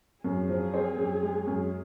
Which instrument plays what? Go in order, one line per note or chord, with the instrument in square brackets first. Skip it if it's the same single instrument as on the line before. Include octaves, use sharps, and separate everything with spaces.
[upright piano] F#2 [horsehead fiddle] G#4
[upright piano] F3
C4
F#2
G#3
F#2